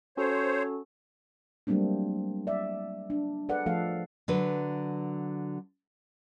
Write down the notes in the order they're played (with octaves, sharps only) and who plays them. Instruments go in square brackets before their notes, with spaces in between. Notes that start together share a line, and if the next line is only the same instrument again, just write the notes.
[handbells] C#4 F#4 A4 [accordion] C5 C#5
[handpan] F#3 G3 A3 A#3 C4 D4
D5 E5
D4
G#4 A4 B4 D5 F#5
F3 A3 A4 F5
[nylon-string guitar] D3 F#3 B4